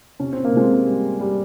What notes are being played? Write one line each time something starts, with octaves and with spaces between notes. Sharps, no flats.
C3 C#4
C4
A#3
C3 G#3 C4
G3
G3